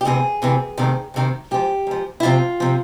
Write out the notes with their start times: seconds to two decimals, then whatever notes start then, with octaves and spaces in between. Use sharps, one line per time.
0.01 G4
0.05 D2 C3 E3 G#4
0.42 D2 C3 E3
0.78 D2 C3 D#3
1.14 D2 C3 D#3
1.51 G#2 F3 G4
1.87 G#2 F3
2.20 E4
2.23 D2 C3 F3 F4
2.60 C3 F3